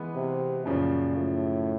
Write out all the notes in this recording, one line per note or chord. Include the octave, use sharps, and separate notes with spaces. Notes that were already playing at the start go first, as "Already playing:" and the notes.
Already playing: E3 G#3 B3
C3
F#2 A#2 C#3 F3
A2